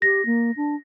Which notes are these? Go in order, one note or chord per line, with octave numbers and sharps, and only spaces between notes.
G4 A#6
A#3
D4